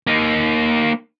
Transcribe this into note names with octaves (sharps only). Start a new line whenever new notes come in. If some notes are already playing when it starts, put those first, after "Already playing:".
A#3 D#4